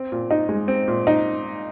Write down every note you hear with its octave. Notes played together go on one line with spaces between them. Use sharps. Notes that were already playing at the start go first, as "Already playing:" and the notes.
Already playing: C4
A#2
D#4
G#3
C4
A#2
D#4